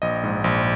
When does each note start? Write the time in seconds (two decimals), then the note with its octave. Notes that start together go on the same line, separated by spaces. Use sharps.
0.02 A#1 D#5
0.23 G#2
0.44 A#1